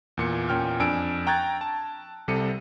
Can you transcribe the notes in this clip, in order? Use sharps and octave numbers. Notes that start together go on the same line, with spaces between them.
E2 A#2 C#7
E2 A#2 C#4 G5 F6
F2 D4 G#5 E6 D7
G5 A#5 C#6 F#6 G#6 A6
A5
C2 C3 G3 A4 C#7 D#7